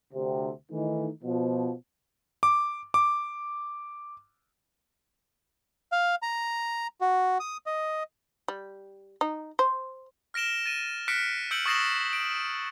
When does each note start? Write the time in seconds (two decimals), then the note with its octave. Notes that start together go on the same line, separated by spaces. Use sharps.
0.13 D2 C3
0.71 D#3 E3 A3 D#4
1.24 B2 F3
2.43 D6
2.94 D6
5.92 F5
6.22 A#5
7.01 F#4
7.40 D#6
7.66 D#5
8.48 G3
9.21 D#4
9.59 C5
10.34 F6 A#6 D7 E7 G7
10.66 A6 D#7
11.08 F6 F#6 A#6 B6 C#7 D7
11.51 E6 G6 C#7 D7 F#7
11.66 C#6 D#6 A6 A#6 C7 E7
12.13 D7